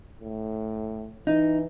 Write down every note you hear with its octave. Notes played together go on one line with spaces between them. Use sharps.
A2
E3 D#4